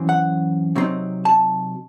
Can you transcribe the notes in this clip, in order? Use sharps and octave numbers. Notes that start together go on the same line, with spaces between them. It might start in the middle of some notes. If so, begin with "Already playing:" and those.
Already playing: F#2 E3 C4
F#5
C3 F#3 C4 D#4
A5